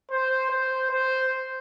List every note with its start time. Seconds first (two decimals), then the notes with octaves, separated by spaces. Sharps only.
0.11 C5
0.50 C5
0.91 C5